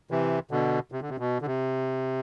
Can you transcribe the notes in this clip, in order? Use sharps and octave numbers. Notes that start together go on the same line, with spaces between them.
C3 E3
B2 D3
C3
D3
C3
B2
D3
C3